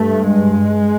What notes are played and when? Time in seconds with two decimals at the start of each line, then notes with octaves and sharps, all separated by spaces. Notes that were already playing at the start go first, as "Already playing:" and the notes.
Already playing: G2 A3
0.30 G#3